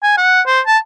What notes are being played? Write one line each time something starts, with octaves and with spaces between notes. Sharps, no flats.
G#5
F#5
C5
A5